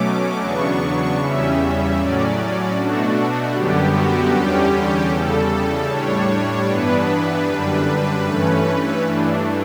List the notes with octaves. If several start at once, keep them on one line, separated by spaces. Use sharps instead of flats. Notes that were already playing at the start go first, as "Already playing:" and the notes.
Already playing: B2 F#3 A3 C#4 D6
E2 C#3 F#3 B3 D4 C#6
E2 C#3 G3 C#4 E5
A2 F#3 C#4 D5
B2 A3 D4 F#4
F#2 D3 G3 B3 G4
F#4
E2 D3 G3 C#4 G4
E2 C#3 G3 A4
A2 G3 D4 C#5
G2 E3 B3 D4 B4
F#2 D3 G3 D4
G2 E3 A3 C#4
G2 E3 A3 D4